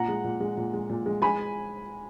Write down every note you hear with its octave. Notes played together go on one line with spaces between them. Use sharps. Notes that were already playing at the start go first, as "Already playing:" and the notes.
Already playing: A#2 F#5 A#5
G#3
A#2
G#3
A#2
G#3
A#2
G#3
G#3 G#5 B5